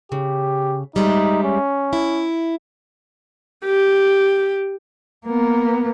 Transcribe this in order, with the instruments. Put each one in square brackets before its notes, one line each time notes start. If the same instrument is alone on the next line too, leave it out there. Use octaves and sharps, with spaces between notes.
[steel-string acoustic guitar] C#3 [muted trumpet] G4
[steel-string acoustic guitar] G3 G#3 E5 [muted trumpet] D#4
[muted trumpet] C#4
[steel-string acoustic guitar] E4
[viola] G4
[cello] A#3 B3